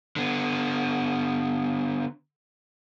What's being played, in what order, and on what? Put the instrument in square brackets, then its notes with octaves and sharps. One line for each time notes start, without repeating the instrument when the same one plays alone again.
[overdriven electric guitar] D3 B3